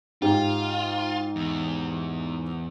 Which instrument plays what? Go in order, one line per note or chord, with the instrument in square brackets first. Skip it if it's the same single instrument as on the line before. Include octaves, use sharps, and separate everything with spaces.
[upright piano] G#2 G4 [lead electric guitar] F4
[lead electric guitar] E2